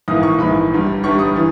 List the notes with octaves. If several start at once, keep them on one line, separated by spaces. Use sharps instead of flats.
A#1 G#2 E3 A#3 D#6
C#6
A#1 G#2 E3 A#3 B5
G1 G2 G3
G1 G2 G3 C#6
D#6
E3